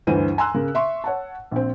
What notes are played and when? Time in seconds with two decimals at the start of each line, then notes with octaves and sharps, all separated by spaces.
0.07 D2 G2 E3 C5 D#7
0.38 G#5 A#5 C6 E6 F#6
0.54 C#3 A#4
0.75 E5 C6 C#6
1.04 C#5 F#5 A5
1.51 A#1 C4